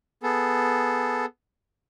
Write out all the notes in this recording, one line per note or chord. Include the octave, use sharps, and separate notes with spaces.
B3 G#4 A4